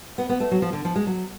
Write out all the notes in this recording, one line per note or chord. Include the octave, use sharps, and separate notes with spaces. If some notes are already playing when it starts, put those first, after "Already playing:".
B3
B3
A3
F#3
F3
D3
F3
G#3
F#3